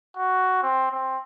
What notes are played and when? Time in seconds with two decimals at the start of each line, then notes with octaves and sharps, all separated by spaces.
0.17 F#4
0.62 C4
0.92 C4